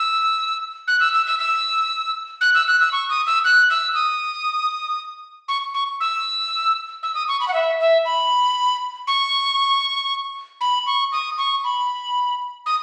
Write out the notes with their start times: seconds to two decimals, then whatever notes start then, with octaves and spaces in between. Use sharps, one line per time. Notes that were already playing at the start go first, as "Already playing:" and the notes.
Already playing: E6
0.88 F#6
1.00 E6
1.13 E6
1.27 E6
1.39 E6
2.41 F#6
2.55 E6
2.67 F#6
2.80 E6
2.92 C#6
3.10 D#6
3.27 E6
3.44 F#6
3.70 E6
3.95 D#6
5.48 C#6
5.74 C#6
6.00 E6
7.03 E6
7.15 D#6
7.28 C#6
7.40 B5
7.48 F#5
7.54 E5
7.80 E5
8.05 B5
9.07 C#6
10.61 B5
10.87 C#6
11.12 D#6
11.38 C#6
11.64 B5
12.66 D#6